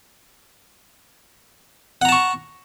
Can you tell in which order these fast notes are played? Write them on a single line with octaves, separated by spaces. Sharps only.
F#5 A#5 A5 C#6